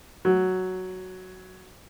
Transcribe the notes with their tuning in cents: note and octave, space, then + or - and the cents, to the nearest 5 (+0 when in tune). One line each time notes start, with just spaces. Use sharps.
F#3 +5